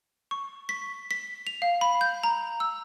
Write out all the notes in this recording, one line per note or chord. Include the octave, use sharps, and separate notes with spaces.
C#6
B6
B6
F7
F5
B5
G6
A#5
E6